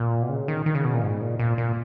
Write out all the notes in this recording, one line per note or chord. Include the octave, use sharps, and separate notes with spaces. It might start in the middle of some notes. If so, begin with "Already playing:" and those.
Already playing: A#2
B2
C#3
D#3
D#3
C#3
B2
A#2
G#2
A#2
A#2
A#2